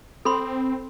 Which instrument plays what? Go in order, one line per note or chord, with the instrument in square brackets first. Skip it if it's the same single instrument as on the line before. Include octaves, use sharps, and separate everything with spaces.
[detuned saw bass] C4 [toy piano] A4 B5 C6